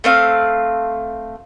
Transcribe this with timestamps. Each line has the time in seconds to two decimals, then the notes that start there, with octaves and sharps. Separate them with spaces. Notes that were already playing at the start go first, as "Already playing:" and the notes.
0.04 A3 C4 F5